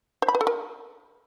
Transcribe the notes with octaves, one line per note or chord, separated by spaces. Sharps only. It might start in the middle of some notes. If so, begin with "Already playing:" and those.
C5
B5
B4
A4
A#4